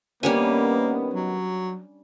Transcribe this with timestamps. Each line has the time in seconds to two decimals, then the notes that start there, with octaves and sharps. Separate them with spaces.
0.23 D#3 G3 A#3 B3 C#4 D4 C#5 G#5
1.14 F#3